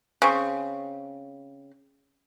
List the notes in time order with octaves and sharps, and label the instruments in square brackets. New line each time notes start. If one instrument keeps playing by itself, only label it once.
[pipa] C#3 C4 C#6